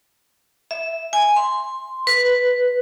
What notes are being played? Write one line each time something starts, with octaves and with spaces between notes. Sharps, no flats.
E5
G#5
C6
B4